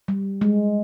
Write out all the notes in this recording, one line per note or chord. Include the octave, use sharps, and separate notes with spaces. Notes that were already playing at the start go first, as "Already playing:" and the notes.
G3
G#3